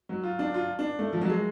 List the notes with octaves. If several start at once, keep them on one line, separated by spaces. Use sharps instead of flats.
F#3
F4
D4
F4
D4
A3
F3
F#3
G#3